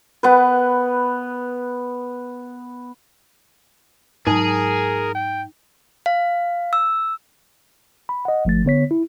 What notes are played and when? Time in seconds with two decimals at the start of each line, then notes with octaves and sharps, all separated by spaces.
0.23 B3 B4
4.27 G#2 F#3 D#4 G#4 A#4
5.15 G5
6.06 F5
6.73 E6
8.09 B5
8.25 D#5 F#5
8.45 G1 F3 A3 A6
8.65 D3 B3 C#5 B6
8.91 E4